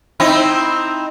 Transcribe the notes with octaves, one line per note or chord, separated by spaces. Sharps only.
C4 D#4 E4